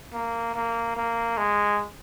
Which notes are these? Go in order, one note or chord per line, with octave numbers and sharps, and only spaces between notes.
A#3
A#3
A#3
G#3